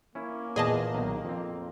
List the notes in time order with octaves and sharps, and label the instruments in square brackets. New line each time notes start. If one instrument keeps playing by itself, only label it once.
[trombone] A#3 [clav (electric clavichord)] C#4 E4
[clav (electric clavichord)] E2 [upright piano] A#2 [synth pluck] G#4 D#5 A5
[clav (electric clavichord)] B1 D#3 [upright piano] A#5
[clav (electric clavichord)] F2 C4